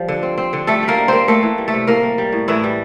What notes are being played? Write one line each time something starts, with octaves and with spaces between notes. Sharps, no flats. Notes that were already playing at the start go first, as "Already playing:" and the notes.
Already playing: F3 G3
D3
C4
C4
D3
G3 A3 A4
G3
A#3 A#4
G3
A#3 C4 C5
A3 A#3 A4
E3
G3
A3 A4
C3
A2 A#3 A#4
G3
G3
A2
A2 E3 E4
G3